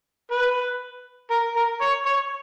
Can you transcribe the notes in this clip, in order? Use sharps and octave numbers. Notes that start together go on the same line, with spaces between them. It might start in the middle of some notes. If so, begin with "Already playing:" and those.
B4
A#4
A#4
C#5
C#5